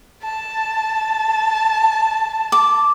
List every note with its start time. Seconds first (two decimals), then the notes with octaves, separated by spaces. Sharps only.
0.23 A5
2.52 D6